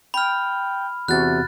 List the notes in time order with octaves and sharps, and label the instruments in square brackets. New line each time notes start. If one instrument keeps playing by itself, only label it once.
[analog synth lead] G5 [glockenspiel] B5 F6
[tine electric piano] E2 C3 [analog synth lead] F#4 [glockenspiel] F#6 A6